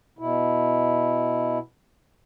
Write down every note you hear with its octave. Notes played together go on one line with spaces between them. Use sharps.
B2 E4